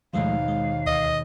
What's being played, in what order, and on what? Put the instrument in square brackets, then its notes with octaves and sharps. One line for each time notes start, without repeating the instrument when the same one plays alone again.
[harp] G#1 D#2 B2 [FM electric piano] F3 G#3 A3 [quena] F5
[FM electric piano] G#3
[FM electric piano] D2 [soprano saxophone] D#5